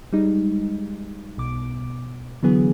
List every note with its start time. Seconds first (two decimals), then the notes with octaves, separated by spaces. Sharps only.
0.13 G3 G#3 D#4
1.37 B1 B2 D6
2.43 D3 E3 F#3 B3 G#4